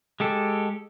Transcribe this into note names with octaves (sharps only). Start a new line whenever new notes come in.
G#3 G4 A4